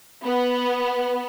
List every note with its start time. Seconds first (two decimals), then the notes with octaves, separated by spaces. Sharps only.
0.23 B3